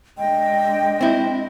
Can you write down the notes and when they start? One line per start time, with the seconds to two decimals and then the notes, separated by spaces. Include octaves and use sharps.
0.18 G#3 D4 D#5 G5
1.01 C4 E4